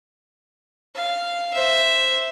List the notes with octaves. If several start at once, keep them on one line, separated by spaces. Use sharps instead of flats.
F5
C5 E5